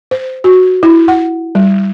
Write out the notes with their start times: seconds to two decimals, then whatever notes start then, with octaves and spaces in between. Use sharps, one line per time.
0.11 C5
0.44 F#4
0.83 E4
1.08 F#5
1.55 G3